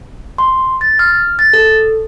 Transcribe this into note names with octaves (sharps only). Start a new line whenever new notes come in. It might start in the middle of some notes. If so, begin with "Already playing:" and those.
C6
A6
F6
A6
A4